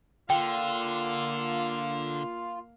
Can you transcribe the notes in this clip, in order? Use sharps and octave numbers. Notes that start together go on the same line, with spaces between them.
D3 A#3 F4 F5 G5